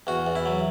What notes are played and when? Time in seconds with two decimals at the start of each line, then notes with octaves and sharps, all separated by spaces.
0.07 E2 F#4
0.27 E2
0.35 E4
0.46 F#3